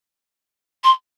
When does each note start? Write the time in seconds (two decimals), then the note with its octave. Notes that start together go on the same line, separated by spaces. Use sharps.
0.83 C6